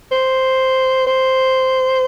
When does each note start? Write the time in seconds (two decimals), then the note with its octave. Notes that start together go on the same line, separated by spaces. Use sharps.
0.12 C5
1.07 C5